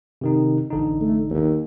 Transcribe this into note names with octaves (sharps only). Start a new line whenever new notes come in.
C3 D#3 D#4
A1 D3 D#4
A3
D#2